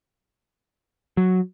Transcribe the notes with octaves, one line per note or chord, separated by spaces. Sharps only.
F#3